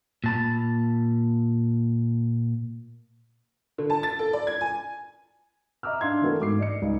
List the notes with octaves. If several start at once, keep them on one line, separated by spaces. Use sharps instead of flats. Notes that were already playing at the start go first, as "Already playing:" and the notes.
A#2 A5 B5
D3
A5
A6
A4
D5
G#6
G#5
D#5 E5 A#5 D6 E6 F6
D4 F5 C6 G#6
E3 A3 B3 F#4 A4 A#4
G#2 D6 C7
D5 D#5 C#7
C#2 D#4